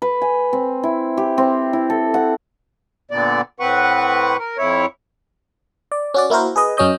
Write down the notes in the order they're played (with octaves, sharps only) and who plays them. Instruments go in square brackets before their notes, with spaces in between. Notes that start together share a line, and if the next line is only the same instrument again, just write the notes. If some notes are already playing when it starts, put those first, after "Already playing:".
[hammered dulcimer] B4
G#5
C4
E4
G4
C4
E4
A4
F#5
[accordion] A#2 D3 B3 D5
A2 C4 B4 F#5 C#6
A#4
F2 E4 C#5
[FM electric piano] D5
C#4 F#4 D5
A#3 E4 F#4 A#4 C5
G#4 B4 D#5
F#2 F#3 C#4 C#5 D#5 G6